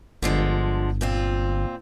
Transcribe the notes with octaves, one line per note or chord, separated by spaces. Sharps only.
G1 D3 F3 G#3
A#2 C4 F4